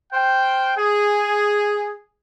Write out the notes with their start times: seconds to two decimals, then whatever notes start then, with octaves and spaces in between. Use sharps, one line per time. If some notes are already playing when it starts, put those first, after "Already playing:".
0.13 C5 F5 G5
0.77 G#4